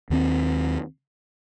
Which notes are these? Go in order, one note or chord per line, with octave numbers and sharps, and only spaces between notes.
D#2 D#3 G3 C4